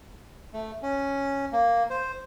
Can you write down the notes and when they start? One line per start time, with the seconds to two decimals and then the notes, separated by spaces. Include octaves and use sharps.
0.53 A3
0.82 C#4
1.52 A#3
1.90 C5